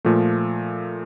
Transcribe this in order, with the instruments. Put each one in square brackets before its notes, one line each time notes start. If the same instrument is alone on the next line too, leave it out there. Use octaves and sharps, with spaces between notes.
[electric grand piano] A#2 F3 A3